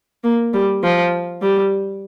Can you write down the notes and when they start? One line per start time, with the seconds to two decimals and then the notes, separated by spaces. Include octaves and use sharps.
0.24 A#3
0.54 G3
0.83 F3
1.41 G3